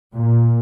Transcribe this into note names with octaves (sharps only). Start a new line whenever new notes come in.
A#2